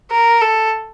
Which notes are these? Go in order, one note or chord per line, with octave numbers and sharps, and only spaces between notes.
A#4
A4